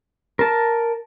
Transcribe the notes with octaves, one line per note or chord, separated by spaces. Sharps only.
A#4 A5